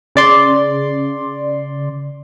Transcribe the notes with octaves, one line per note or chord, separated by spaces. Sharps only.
C#3 D5 C6